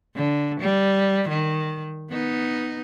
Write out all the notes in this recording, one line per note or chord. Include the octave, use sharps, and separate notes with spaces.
D3
G3
D#3
B3 D#4